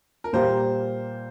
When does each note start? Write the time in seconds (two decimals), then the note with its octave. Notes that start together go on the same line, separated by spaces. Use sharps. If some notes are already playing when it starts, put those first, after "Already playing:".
0.24 A#4
0.33 A#2 G3 A#3 G4 C5